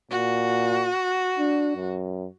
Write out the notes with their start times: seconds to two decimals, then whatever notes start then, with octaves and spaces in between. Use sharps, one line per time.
0.11 A#2 F#4
1.39 D4
1.76 F#2